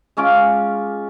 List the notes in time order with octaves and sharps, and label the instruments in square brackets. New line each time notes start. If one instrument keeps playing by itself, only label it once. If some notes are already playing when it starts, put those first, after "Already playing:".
[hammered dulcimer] G#3 C#4 F4 D6